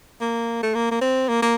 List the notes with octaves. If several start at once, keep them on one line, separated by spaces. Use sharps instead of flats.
A#3
A3
A#3
A#3
C4
A#3
A#3